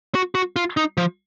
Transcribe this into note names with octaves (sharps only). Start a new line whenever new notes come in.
F#4
F#4
F4
D#4
F3